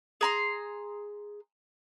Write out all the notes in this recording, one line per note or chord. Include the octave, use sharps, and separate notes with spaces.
G#4 A#5 C6